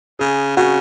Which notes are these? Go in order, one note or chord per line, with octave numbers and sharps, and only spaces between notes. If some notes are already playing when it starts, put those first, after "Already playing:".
C#3 G#4
C#3 F#4